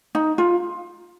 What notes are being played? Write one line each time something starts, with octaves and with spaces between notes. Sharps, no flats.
D#4
F4